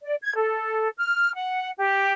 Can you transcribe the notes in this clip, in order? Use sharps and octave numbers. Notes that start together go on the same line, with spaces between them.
D5
G#6
A4
F6
F#5
G4